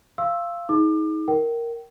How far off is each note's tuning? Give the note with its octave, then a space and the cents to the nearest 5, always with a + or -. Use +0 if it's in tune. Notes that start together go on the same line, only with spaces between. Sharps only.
F5 -15 C6 +35 E6 +0
D#4 +30 G#4 +25 D6 +30
A#4 +0 G5 -30